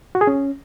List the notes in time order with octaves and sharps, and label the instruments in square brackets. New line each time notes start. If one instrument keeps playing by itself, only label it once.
[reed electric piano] F#4
G#4
C#4